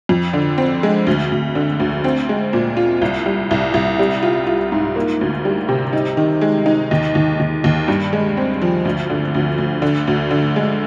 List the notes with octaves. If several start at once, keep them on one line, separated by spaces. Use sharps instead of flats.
F2
D3
C4
G#3
D2
D2
D3
D2
C4
G#3
A#2
F4
C2
G3
C2
C2
G3
F4
F4
G#2
A#3
D2
G3
C3
D#4
D#3
G#3
D#4
D#2
D#2
D#2
D#2
G2
G#3
C4
F3
D2
D3
D2
D2
D3
D2
D3
G#3